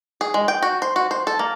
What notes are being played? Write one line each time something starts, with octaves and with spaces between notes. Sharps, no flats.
G#4
G#3
G5
F#4
C5
F#4
C5
A4
A#3